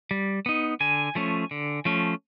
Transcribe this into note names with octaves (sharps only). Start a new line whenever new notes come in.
G3
B3 D#4
D3 G#5
F3 A3 C#4
D3
F3 A3 C#4